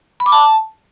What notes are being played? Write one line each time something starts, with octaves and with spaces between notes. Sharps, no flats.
B5
D6
A5